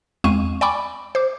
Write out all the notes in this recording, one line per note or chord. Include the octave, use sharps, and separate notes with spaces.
E2 G#3 C4 F5 C#6 D#7
D5 G5 G#5 B5 C#6 D6
C5 D6